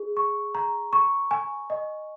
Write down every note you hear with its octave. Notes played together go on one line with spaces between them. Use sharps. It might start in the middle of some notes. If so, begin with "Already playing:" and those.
Already playing: G#4
C#6
A#5
C#6
G#5
D#5